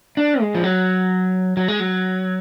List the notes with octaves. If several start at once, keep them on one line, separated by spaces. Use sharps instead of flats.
D4
G#3
F3
F#3
F#3
G#3
F#3